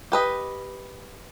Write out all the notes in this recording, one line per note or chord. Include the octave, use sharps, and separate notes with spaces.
G4 B4 D#5